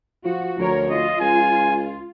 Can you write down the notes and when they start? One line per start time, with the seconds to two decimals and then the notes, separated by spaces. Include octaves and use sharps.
0.25 F3 F#4
0.59 D2 F3 A#4 C#5
0.90 F4 D#5
1.20 C#2 G#5